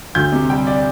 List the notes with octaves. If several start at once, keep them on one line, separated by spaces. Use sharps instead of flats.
D2 G6
C3
G3 G5
D5